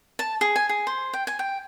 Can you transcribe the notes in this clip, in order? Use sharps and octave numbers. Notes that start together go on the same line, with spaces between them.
A5
G#4
G#5
G#4
C5
G5
G#5
G5